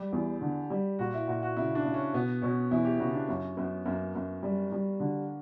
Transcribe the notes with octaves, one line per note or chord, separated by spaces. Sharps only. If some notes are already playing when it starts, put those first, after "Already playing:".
Already playing: G3 G4
E2
D3
G3
A#2 F#4
E4
A#2 F#4
F#4
C#3 E4
D4
C#3
C#4
B2 B3
B2 C#4
E2 E4
G4
C#3 F#4
D4
F#2 C#4
F#2 B3
F#2 A#3
F#2
G3
G3
D3